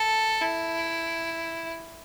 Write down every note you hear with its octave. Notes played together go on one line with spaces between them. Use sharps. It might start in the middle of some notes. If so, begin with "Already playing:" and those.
Already playing: A4
E4